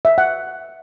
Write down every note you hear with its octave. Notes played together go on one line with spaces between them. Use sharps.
E5
F#5